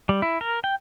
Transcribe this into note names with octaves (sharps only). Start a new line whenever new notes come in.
G3
E4
A#4
G5